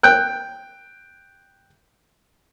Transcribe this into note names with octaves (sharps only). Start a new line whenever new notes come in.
G5 F#6